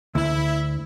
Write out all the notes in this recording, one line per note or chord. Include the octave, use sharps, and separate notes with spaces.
D2 E4